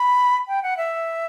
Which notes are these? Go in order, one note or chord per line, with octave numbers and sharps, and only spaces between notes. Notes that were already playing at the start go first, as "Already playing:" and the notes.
Already playing: B5
G5
F#5
E5